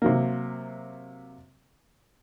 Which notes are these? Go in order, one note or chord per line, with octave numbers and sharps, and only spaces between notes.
C3 F#3 A#3